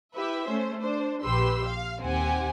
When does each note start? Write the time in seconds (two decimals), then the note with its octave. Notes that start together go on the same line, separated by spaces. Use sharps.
0.15 E4 G4 B4 E5
0.48 A3 C#4 C5
0.82 D4 C5
1.24 A#1 G4 B4 C6 E6
1.66 F5
2.01 D#2 C4 G4 F#5 G#5